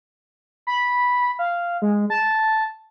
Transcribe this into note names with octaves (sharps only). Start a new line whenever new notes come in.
B5
F5
G#3
A5